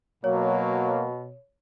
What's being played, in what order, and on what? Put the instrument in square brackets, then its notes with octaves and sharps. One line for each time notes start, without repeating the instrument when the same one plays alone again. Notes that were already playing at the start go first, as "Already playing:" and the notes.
[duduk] B2 [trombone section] F#3 A#3 [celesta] C#5